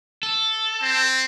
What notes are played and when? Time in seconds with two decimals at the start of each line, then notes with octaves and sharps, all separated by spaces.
0.23 A4
0.83 C4